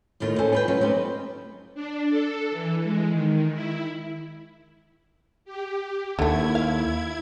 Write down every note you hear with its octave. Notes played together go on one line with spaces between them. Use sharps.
D#2 A2 D#3 F4
C#4 G#4 A4 C5
F4 B4 G5
F#3 C#4 F4 G#4
C4 C#4 D#4 G4 B4
D4
A4
E3
G#3
D#3
E4
G4
D#2 D3 A3 E4 G#6
F5